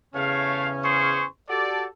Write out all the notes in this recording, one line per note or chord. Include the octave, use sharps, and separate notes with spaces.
E2 C#3 A3 C#4 C#5 F5
G#4 C5 C#6
F#4 G4 A4 D5